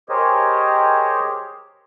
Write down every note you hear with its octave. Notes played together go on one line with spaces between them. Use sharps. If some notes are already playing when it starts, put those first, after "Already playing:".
G4 G#4 A#4 C5 C#5 D#5